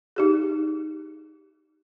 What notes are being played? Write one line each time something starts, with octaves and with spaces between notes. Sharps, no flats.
D#4 G4 G#4